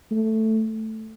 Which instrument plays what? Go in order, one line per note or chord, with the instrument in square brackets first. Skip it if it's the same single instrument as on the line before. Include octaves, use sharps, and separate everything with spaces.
[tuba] A3